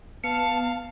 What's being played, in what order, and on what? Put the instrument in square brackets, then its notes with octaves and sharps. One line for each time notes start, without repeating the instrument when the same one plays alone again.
[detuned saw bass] B3 [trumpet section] F5 [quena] A5 [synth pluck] C#7